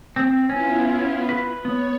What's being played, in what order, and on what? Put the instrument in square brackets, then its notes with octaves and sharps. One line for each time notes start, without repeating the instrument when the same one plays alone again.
[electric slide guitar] C4
[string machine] B3 E4 F4 [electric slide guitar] C#4
[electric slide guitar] B4
[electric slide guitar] B3 [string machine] C#5